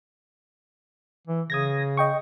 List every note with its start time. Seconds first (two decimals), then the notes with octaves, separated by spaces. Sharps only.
1.27 E3
1.50 C#3 D#6 G#6 A#6
1.97 D#5 G5 C#6